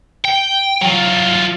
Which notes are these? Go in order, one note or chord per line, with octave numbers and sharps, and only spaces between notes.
G5
F#3 F4